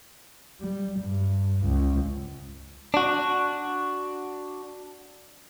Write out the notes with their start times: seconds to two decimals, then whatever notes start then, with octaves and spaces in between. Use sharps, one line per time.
0.61 G3
1.00 G2
1.65 C#2
2.94 D4 F#4